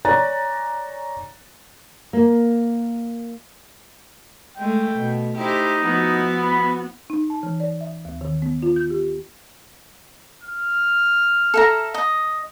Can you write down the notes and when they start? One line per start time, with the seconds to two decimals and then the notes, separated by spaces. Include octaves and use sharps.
0.05 C#5 D5 G#5 A#5 F#6 A6
2.13 A#3
4.57 G#3 A3 G5
4.95 B2
5.37 D#4 E4 G4 C5
5.84 F3 B3 E4 F#4
6.42 B5
7.10 D#4
7.30 A5
7.43 E3
7.60 D5
7.81 E5
8.05 D#2
8.21 D#3
8.42 B3
8.63 F4
8.76 G6
8.90 G4
10.42 F6
11.54 A4 E5 A#5
11.94 D#5